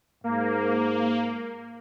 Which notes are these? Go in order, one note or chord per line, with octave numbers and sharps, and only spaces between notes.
G#2 A#3